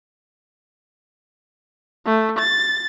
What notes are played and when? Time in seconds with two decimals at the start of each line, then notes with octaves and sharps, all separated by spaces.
2.06 A3
2.39 A6